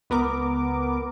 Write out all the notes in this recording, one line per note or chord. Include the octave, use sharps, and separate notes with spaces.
C#2 B3 A#4 D6